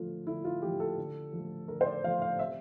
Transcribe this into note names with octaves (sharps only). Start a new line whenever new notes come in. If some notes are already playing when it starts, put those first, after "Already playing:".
Already playing: D3 F3 A3 F4
D3 E4
F4
F3 A3 G4
A4
D3
F3 A3
D3 A#4
C5
D5
F3 A3 F5
F5
C3 E5